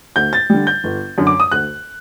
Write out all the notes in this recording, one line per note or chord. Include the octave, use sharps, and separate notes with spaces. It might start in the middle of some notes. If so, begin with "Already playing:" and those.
D2 G6
A6
D3 G3
G6
G1
F#2 D3
D6
D#6
D2 F#6